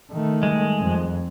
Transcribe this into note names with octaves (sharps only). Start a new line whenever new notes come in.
D#3 A3
G3 G#3
F2